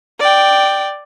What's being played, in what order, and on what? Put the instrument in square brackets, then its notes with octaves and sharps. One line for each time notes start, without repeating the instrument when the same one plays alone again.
[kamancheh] D5 G5